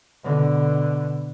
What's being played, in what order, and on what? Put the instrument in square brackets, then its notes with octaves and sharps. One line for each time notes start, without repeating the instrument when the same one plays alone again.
[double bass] B2 D3